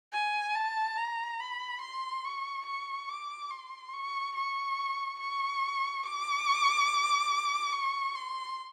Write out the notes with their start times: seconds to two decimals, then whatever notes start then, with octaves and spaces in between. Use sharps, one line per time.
0.13 G#5
0.55 A5
0.97 A#5
1.40 B5
1.81 C6
2.24 C#6
2.65 C#6
3.09 D6
3.50 C6
3.93 C#6
4.35 C#6
5.19 C#6
6.03 D6
7.72 C#6
8.15 C6